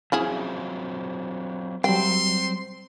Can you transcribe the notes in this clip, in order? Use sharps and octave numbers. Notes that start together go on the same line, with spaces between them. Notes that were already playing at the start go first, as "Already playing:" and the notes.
C#3 F#3 C4 E4 F4 G#4
F#3 G3 C4 G5 C6